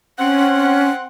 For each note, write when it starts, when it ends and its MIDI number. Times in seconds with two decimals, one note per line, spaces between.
0.19 1.07 60
0.19 0.88 61
0.19 1.07 78